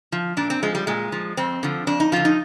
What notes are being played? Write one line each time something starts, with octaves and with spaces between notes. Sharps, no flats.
F3
A#2 D4
C4
F3 G#3
G3
A#2 G#3
F3
F2 C4
D3 F3
F2 D4
D#4
D3 F3 F4
D#4